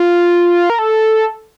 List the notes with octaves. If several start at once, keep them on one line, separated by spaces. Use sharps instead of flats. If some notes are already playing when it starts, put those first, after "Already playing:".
Already playing: F4
A#4
A4